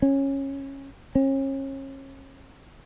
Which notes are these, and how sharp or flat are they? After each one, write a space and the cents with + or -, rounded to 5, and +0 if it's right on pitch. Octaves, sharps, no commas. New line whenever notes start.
C#4 -15
C#4 -35